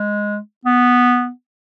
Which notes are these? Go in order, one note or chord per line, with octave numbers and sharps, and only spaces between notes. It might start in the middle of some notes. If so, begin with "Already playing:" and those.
Already playing: G#3
B3